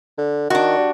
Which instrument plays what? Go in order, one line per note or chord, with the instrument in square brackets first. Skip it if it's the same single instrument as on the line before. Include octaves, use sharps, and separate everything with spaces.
[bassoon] D3
[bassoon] D#3 [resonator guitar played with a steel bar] D4 F#4
[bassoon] G3